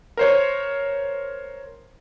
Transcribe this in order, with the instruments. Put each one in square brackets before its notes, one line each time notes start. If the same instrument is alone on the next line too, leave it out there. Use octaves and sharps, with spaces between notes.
[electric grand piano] A#4 C5 C#5